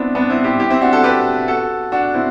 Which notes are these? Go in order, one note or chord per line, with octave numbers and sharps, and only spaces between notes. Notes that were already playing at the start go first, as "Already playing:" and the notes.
Already playing: B3 C4 D4 E4
B3 D4
C4 E4
E4 G4
E4 G4
C4 E4
D4 F#4
F#4 A4
G4 B4
F#4 A4
D4 F#4
C4 E4